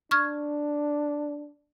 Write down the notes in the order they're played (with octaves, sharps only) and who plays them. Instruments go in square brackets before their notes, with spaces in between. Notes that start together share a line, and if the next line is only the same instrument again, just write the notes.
[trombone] D4 [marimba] C#6 F6 G#6